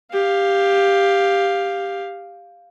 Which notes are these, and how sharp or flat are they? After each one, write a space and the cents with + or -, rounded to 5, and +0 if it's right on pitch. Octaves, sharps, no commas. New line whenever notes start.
G4 +10 F5 +0